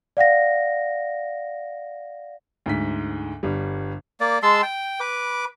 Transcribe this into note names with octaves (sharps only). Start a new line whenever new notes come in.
D5 F5 F#5 A#6
D2 G#2 B6
G1 G3
A#3 D5
G#3 A5 C6 E6
G5
B4 D6